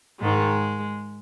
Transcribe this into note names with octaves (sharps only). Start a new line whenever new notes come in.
G#2 D#3 G#3